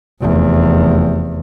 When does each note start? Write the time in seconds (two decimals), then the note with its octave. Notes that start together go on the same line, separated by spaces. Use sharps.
0.21 F1 E2